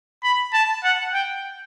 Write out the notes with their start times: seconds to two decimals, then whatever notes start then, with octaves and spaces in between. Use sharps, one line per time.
0.23 B5
0.53 A5
0.84 F#5
1.13 G5